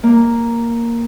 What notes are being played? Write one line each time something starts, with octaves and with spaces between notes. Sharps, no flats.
A#3